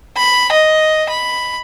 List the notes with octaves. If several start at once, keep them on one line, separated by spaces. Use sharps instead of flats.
B5
D#5
B5